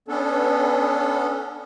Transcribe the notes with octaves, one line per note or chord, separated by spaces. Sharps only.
B3 C#4 D4 A4